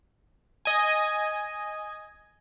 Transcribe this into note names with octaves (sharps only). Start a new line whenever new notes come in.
D#5 G#5